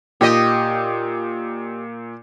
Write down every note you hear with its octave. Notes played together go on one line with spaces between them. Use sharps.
A#2 G4 D#5